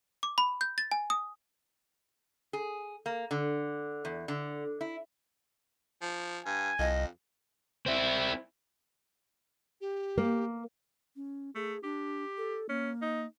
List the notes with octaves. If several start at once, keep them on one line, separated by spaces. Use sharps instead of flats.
D6
B5
G6
A6
G#5
D#6
G#4
A#3
D3
E2
D3
E4
F3
G2 G#5
C2 F2 D#5
C4 E4
G4
A#3
C#4
A3 G#4
D4 G4
A4
A#3 C#4
D#4